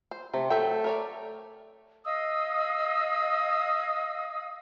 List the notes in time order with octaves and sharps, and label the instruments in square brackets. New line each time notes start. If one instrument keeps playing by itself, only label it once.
[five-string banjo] C5
[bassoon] C3 [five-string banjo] A3
[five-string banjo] F#3 E5 G5 [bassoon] A3
[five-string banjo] A#4 C#5 D5
[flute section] D#5 F5 D#6 E6